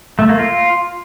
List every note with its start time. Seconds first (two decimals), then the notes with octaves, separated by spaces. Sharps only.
0.19 A3
0.29 A#3
0.39 F4